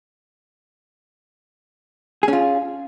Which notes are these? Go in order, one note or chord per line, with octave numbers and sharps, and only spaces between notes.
C#4 F4 G#4